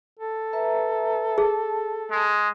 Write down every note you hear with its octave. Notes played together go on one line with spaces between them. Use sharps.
A4
B4 E5 A#5
G#4 A5
G#3